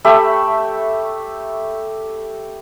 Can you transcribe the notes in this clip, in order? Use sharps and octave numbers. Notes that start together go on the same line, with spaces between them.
A3 G4 E5 B5